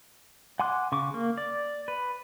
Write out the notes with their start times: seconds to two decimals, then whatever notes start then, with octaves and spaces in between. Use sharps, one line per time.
0.60 F#5 G#5 C6 D6 F#6
0.92 C#3 C#6 D6
1.14 A#3
1.37 D5
1.88 B4